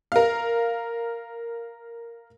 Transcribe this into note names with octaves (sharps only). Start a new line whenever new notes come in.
A#4 F5